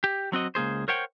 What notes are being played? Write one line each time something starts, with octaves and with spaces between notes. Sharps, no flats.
G4
F#3 C4 F#4 D#5
C#2 A#3 G#4 C5
A#4 C5 C#5 F#5 G5